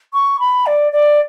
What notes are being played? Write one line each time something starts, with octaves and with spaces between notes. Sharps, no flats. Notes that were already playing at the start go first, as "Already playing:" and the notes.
C#6
B5
D5
D5